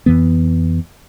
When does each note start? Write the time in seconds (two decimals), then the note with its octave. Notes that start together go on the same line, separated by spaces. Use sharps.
0.06 F2 E3 B3